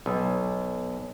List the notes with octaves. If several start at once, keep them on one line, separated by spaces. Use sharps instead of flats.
B1